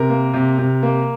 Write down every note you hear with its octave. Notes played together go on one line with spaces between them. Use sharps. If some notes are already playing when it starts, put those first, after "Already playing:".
Already playing: C3 A#4
A#3
C3
C3
A#3